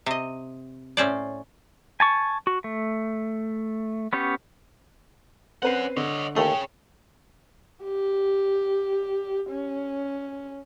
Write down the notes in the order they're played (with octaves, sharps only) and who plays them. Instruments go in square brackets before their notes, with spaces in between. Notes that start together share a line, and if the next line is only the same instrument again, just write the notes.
[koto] C3 D#5
A2 C#4 C5 D5
[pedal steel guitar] G#5 A5 C#6
F#4
A3
B3 C#4 G4 C#5
[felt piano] C4 B4 C7 [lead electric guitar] C#4 F#5
[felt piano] D3 [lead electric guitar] C#5 D#5
[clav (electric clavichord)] D#2 A3 [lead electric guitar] G#4 C#5 [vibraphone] G5
[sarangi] G4
C#4